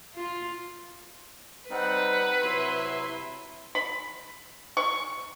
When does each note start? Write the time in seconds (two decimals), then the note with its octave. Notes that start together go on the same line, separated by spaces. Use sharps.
0.15 F4
1.70 G3 C4 D#4 B4 F#5
2.42 C3 F#3 E4 E5 C6
3.75 B5
4.77 C#6